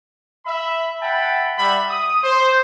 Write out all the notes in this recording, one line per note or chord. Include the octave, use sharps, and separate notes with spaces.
E5 B5
E5 F#5 G5 A5 B5
G3 E5 F#5 B5
D#6
C5